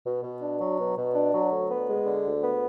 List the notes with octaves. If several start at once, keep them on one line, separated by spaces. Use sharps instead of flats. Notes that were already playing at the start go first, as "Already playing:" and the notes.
B2
B2
D4
F#3
B2
B2
D4
F#3
D2
B3
G#3
D3
D2
B3